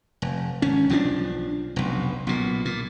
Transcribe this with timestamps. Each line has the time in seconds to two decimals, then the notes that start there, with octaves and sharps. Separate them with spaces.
0.22 F1
0.62 G#1 C#4
0.90 B1 F3 G3 D4
1.76 F1 B1
2.27 B1 A#2
2.65 A#2